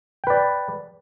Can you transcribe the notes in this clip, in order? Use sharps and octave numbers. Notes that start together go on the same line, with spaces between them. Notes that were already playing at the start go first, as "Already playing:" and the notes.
B4 D5 G5